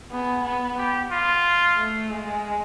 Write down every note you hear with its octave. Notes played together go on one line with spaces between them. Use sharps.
B3 G#4
B3
G4
F4
A3
G#3